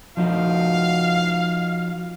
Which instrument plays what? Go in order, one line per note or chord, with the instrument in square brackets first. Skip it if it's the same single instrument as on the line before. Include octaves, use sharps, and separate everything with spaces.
[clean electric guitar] F3 D#4 F#4 [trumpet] F5